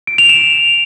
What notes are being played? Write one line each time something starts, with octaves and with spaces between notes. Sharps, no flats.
D7
F7
E7